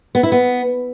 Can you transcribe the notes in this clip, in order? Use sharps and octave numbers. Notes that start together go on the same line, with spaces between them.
B3
E4
B3